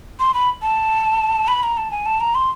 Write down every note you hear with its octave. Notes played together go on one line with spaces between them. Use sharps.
C6
B5
A5
B5
A#5
A5
G#5
A5
A#5
C6